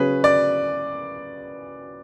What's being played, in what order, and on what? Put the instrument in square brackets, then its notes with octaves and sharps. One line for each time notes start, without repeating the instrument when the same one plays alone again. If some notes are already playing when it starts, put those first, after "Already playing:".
Already playing: [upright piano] C#3 F#3 C#4 G#4 [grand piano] B4
[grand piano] D5